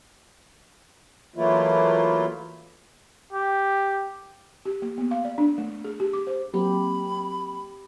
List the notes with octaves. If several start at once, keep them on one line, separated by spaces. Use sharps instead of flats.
E3 F#3 A3 A#3 E4 F4
G4
G4
A#3
B3
F5
D5
D4
A3
G#4
G4
D6
C5
F#3 A#3 C4 G4 B5